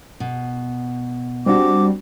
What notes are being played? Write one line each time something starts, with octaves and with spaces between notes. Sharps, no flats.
B2
G3 C4 D4 F#4 D6